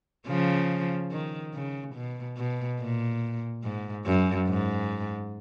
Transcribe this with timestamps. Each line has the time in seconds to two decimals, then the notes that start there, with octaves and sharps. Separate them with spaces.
0.27 C#3 F3
1.11 D#3
1.54 C#3
1.95 B2
2.37 B2
2.80 A#2
3.63 G#2
4.06 F#2
4.48 G#2